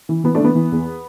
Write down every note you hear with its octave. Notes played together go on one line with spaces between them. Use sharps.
E3
E3 B3
A3 D4
E3 B3
E3
E2